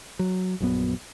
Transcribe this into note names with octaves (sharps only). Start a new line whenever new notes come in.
F#3
A#1 F#2 F#3 B3